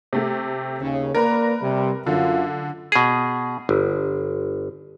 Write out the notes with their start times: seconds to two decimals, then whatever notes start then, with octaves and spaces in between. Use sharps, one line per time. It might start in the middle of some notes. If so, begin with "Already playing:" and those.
0.13 C3 A3 G4
0.81 D#2 C#3
1.15 A#3 A#4 B4 D5 A#5
1.61 C3 G3
2.07 F#2 D3 F4
2.92 B2 G#4
3.69 G1